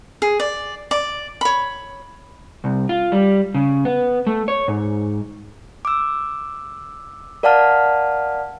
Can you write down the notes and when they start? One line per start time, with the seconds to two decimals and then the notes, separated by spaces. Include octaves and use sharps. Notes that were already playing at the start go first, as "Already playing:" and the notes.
0.22 G#4
0.40 D5
0.91 D5 D6
1.41 C#5 B5
2.64 C2
2.89 F4
3.12 G3
3.54 C#3
3.85 B3
4.27 A3
4.48 C#5
4.68 G#2
5.85 D6 E6
7.43 A#4 D5 F5 F#5 A5 F6